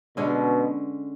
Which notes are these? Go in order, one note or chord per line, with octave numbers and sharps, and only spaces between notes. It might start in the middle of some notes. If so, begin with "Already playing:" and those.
B2 D3 G#3 C#4